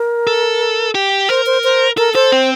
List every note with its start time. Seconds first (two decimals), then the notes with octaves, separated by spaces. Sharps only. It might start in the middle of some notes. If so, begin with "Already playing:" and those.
Already playing: A#4
0.27 A4
0.95 G4
1.29 A#4 C5
1.46 C5
1.64 C5
1.98 A4 A#4
2.14 A4 C5
2.32 C4